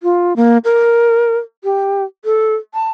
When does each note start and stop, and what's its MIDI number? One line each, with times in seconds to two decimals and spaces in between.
0.03 0.36 65
0.36 0.58 58
0.64 1.38 70
1.64 2.04 67
2.25 2.55 69
2.74 2.91 81